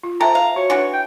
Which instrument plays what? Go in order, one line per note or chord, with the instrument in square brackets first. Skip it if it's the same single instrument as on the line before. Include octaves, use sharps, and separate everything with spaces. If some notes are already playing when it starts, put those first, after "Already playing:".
[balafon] F4
[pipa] A4 [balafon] C5 E5 G5 [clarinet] A#5
[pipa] F5
[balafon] F#4 [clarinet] C#5
[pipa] E3 D4 F#4 [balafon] G#5
[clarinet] G5